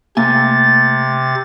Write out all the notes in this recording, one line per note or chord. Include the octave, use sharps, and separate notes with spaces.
C3 A3 A#3 G#5 A6